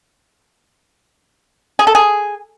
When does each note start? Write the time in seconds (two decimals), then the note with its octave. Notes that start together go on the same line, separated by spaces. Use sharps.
1.79 G#4
1.87 A4
1.95 G#4